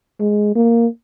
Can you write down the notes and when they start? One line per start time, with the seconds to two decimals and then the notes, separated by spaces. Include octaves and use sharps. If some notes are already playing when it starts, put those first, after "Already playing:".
0.20 G#3
0.55 A#3